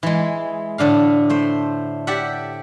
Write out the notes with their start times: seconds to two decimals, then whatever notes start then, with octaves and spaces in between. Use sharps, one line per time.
0.03 E3 G#3
0.78 A2 D3 D4 F5
1.30 A3 C5
2.07 G4 D5 E5 F#5